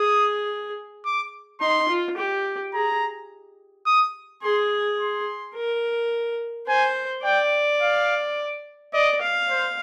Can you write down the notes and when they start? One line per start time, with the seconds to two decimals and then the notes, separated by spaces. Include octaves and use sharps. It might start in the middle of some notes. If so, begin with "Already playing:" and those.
Already playing: G#4 D#6
1.05 D6
1.61 D#4 C6
1.89 F4
2.18 G4
2.74 G#4 A#5
3.86 D#6
4.43 G#4 C6
4.99 C6
5.55 A#4
6.68 C5 G#5
7.24 D5 G5
7.81 F5
8.94 D5 D#5
9.21 F5
9.50 C5